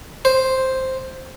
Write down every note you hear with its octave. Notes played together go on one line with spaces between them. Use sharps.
C5